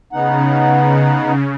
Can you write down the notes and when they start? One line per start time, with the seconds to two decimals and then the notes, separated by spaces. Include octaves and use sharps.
0.13 C#3 B3 D#4 F#5